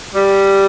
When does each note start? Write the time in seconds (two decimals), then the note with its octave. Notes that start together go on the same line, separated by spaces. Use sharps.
0.13 G3